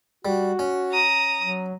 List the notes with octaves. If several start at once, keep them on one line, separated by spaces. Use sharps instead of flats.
G3 F#4
C#4
A#5 D#6
F#3